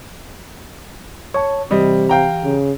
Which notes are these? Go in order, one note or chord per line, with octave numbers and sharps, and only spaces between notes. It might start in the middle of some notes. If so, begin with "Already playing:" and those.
C#5 A5 C#6
C3 E3 G3 G4 D#5
F5 G5 A#5
C#3